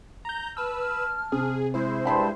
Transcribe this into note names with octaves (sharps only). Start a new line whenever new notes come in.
A#5 G6
B4 A5 E6 F6
C3 G#4
G#3 E4 C5
G2 G5 A5 B5 C6